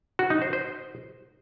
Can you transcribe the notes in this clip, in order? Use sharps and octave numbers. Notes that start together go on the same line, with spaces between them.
F#4
D#4
C5
C5